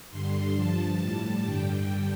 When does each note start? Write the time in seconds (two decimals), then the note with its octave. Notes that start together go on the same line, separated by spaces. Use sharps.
0.10 G2 D3 G3 C6
0.55 G2 F3 A5
0.99 A2 G3
1.43 G2 D3 G3 G5